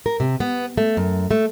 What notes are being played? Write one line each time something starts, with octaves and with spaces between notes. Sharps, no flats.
A#4
C3
B3
A3
F#2
A3